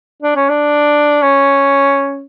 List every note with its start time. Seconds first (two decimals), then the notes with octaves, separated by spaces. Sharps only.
0.22 D4
0.35 C#4
0.49 D4
1.22 C#4